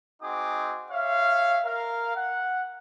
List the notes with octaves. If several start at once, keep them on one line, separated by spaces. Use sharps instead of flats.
C4 D#4 F#4 G#4 D6
C#5 E5 F5
A#4 F5
F#5